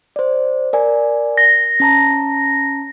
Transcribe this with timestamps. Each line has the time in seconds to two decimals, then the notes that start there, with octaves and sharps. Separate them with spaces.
0.16 C5 D5
0.73 A#4 D5 G#5
1.38 A#6
1.80 C#4 A5 A#5